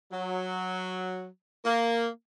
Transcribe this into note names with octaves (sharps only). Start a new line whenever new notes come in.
F#3
A#3